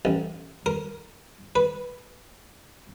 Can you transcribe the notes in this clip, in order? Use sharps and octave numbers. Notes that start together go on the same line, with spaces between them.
A1
A#4
B4